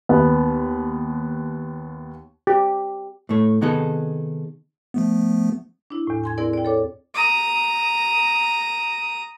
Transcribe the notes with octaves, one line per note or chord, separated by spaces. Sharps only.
D#2 B3
G4
A2 A3 C#5
C3 D#3 B3 D#4 G#4 A4
F3 A3 B3
D4 E4
E2 A2
G#5 C6 G#6
C4 E4 G#4 A#4 D5
D5 G5
A4 C#5 D6
A#5 D#6